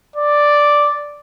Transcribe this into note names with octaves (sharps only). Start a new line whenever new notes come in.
D5